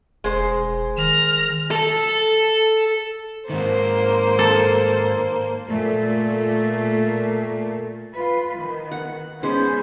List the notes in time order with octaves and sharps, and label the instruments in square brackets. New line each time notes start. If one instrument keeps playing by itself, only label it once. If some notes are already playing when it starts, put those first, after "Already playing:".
[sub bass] E1 [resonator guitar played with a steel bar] G#3 C5
[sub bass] D#3 [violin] F6 A#6
[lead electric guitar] A4 A5
[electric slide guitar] G#2 D#3 [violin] A#3 C5
[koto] A4
[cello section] A#2 A3
F4 B4
D#3
[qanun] F#5
[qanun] G#3 C5 [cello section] B3 C#4